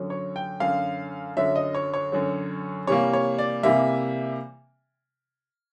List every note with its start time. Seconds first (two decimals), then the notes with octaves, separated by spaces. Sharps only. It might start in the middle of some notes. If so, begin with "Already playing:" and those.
Already playing: F#2 D3 F#3
0.10 C#5
0.36 G5
0.60 F#2 D3 F#3 F5
1.37 F#2 D3 F#3 E5
1.56 D#5
1.75 C#5
1.94 C#5
2.12 F#2 D3 F#3
2.87 C3 E3 G3 A#3 C#5
3.13 C#5
3.38 D5
3.63 C3 E3 G3 A#3 E5